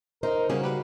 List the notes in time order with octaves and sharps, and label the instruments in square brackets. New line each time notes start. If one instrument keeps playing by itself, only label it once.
[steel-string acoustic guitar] D#4 [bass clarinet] A#4 [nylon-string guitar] C5
[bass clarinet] C#3 [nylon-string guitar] G3 [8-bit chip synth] A#3 C#4 G#4 [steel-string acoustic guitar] F#4
[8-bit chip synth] G4 B4